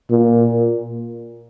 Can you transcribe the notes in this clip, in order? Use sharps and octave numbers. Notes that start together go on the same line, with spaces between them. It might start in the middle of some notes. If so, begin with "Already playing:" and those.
A#2